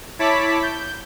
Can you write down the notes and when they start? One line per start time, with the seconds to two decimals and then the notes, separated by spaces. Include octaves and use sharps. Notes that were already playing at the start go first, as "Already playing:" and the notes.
0.19 E4 C#5 A5 B5 D6 B6
0.63 G6